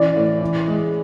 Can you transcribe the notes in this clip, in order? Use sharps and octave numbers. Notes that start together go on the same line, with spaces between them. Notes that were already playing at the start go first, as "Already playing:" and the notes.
Already playing: E3 C#4 D5
A2
E3
G#3